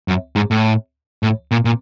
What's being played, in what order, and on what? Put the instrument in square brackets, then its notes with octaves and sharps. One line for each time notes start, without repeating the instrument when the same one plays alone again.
[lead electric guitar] F#2
G#2
A2
A2
A#2
A#2